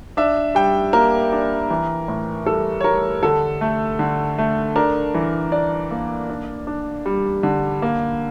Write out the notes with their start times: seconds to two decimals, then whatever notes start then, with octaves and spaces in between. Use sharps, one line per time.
0.17 D4 E5
0.55 G3 G5
0.93 A#3 A#4
1.33 D4
1.70 E3
2.08 A2
2.46 G3 A4
2.81 C#5
2.84 G3 A#4
3.23 D3 A4
3.61 A3
3.99 D3
4.38 A3
4.76 D4 A#4
5.14 E3
5.52 D4 D5
5.91 A#3
6.30 D4
6.67 D4
7.06 G3
7.43 D3
7.82 A#3